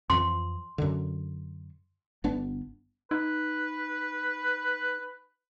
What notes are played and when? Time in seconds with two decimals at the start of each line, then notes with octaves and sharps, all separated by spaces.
0.10 F2 E3 F3 C6
0.78 F#2 D3
2.24 G1 B3 D4
3.11 D#4 B4